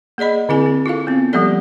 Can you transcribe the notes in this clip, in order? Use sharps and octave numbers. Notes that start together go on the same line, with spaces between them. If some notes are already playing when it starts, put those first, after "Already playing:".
A#3 G#4 D5 D#5 B5
D3 C4 E4 G#4 G#5
C4
E4 F4 A4 F5
B3 C4
F3 G3 A#3 G4 A4 D5